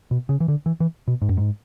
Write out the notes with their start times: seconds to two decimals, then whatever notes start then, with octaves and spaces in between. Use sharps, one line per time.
0.11 B2
0.29 C#3
0.40 E3
0.48 D3
0.66 E3
0.80 E3
1.08 B2
1.22 G#2
1.29 F#2
1.37 G#2